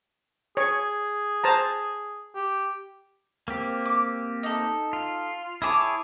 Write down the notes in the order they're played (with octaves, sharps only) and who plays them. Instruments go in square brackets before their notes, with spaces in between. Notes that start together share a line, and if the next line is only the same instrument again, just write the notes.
[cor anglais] G#4 [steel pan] C#5
[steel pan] C5 A5 A#5
[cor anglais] G4
[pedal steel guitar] A#3 C4 G4
[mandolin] D6
D#4 A4
[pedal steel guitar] F4
[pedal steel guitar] E4 G#4 C#5 [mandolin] A5 D6 D#6